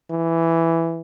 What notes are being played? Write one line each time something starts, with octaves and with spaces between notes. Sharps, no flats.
E3